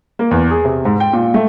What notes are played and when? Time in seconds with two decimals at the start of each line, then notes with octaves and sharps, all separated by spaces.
0.19 A#3
0.31 E2
0.51 G#4
0.65 C3
0.85 G#2
1.00 G5
1.13 A#2
1.34 A3